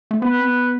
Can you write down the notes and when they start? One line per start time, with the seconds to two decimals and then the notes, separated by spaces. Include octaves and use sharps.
0.11 A3
0.22 B3 B4
0.39 C4
0.45 B3